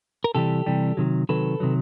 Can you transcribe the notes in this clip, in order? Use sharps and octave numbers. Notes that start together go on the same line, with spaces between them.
A#4
C3 E3 G3 G4 A4
C3 E3 G3
C3 D#3 F#3
C3 D#3 F#3 A4 B4
C3 D#3 F#3